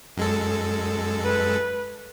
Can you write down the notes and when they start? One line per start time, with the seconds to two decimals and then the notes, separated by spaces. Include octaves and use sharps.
0.17 F#2 G#3 A4
1.24 B4